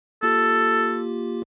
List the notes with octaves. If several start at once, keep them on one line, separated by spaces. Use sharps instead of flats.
A#3 F4 G4 A4